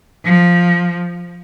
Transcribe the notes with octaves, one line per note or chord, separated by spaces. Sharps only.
F3